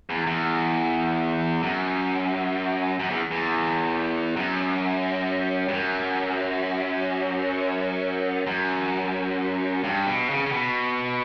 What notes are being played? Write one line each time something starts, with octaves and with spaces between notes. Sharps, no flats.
E2
E2
F#2
F#2
E2
E2
F#2
G2
F#2
F#2
G2
B2
C#3
C#3
B2